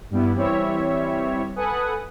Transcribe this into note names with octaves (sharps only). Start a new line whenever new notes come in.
G2 G3 B3 E4
E3 G3 C4 E4 C#5 E5
A4 B4 F#5 G#5 D#6 F#6